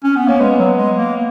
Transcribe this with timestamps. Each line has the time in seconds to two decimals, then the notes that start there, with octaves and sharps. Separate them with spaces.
0.04 C#4
0.16 B3
0.28 A#3 C#4
0.40 G#3 B3
0.58 F#3
0.77 G#3
0.96 A#3